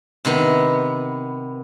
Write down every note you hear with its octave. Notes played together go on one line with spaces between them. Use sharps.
C3 D#3 B3